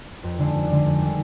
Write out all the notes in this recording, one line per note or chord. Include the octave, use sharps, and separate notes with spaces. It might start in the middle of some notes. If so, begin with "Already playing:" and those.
F2
D3 G#3 D4
F2
D3 G#3 D4
F2
D#3 G3